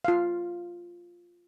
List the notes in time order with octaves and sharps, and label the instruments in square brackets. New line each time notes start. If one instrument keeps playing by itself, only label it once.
[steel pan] F4 F5